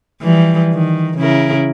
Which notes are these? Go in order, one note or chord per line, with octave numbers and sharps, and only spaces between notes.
E3 F3 G3
D#3
C#3 E4 A#4